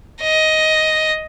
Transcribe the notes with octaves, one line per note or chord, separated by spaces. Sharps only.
D#5